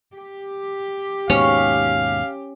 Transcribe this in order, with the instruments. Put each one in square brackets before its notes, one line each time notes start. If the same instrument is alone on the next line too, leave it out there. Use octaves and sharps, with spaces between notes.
[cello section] G4
[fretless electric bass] D#2 G#2 B2 [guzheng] C#4 [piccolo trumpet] F5